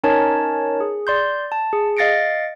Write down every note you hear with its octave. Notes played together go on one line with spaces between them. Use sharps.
C#4 D#4 A#4 C#5 A5
G#4
D5 C6 G6
A5
G#4
D#5 F5 A6 A#6 C#7 D7